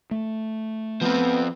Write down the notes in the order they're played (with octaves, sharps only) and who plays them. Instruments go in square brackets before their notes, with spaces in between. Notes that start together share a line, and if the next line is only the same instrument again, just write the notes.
[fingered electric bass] A3
[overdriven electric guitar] F3 C4 [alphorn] B3